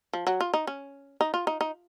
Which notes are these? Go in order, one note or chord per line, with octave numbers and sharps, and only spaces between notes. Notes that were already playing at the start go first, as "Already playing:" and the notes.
F3
F#3
F4
D#4
C#4
D#4
F4
D#4
D#4